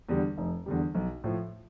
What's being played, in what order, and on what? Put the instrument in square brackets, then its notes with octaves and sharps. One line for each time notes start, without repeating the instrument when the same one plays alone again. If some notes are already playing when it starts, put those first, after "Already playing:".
[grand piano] E2 D3 G3
F1
E2 D3 G3
B1
A2 F3